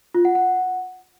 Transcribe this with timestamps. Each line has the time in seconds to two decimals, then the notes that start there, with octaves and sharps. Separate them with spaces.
0.15 F4
0.25 F#5
0.35 F#5